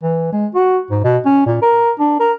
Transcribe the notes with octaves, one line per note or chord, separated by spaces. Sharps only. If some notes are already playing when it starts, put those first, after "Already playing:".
E3
G#3
F#4
G#2
B2
C#4
A#2
A#4
D4
A#4